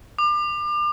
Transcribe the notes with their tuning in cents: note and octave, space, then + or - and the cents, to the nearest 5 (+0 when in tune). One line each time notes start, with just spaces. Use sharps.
D6 +35